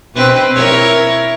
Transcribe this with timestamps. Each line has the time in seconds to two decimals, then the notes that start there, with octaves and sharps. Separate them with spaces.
0.14 B2 C4 B4
0.55 E4 A#4 C#5